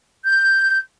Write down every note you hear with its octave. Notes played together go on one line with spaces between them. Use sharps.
G6